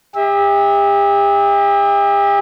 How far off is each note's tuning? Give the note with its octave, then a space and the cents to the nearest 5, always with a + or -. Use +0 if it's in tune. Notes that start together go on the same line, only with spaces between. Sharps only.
G4 +40 E5 -30